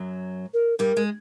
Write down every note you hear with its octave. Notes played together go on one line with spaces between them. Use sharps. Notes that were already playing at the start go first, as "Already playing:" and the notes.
Already playing: F#2 F#3
A#4
G2 G3 A#4
G#3